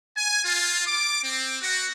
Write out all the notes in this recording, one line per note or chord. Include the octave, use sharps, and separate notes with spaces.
G#5
F4
D6
C4
F#4